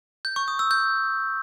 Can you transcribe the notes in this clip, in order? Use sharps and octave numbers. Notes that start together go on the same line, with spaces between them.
G6
C#6
D#6
E6
G6